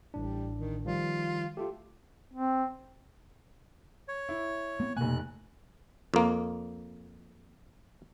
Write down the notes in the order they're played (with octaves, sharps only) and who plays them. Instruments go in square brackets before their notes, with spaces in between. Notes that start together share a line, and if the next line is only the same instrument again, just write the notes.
[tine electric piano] A1 A2 D4 [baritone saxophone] G3
[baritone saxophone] D#3
[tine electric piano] D#3 F3 G3 [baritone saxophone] F4
[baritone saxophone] A3 [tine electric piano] F4 G4
[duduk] C4
[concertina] C#5
[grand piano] E4
[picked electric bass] A3 B3 C4
[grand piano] F1 G#5 [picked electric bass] B2 A#3 [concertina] F#6
[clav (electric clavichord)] F2 A#3